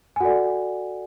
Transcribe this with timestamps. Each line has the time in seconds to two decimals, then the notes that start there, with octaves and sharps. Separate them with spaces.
0.16 G#5
0.20 F#4 A4 D5 F#5